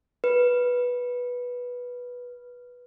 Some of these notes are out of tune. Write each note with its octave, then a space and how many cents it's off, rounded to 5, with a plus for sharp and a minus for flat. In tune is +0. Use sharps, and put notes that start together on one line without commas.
B4 -10